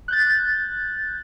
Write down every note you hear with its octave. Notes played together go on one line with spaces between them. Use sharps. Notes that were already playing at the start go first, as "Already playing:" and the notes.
F#6 G6 A6